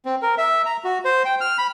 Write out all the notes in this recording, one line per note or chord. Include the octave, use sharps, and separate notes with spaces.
C4
A#4
E5
A#5
F#4
C5
G5
F6
B5